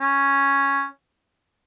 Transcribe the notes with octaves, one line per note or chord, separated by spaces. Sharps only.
C#4